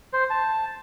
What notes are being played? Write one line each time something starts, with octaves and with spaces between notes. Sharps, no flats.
C5
A5